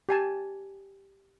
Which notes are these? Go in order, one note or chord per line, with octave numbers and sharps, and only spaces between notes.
G4 G#5 A5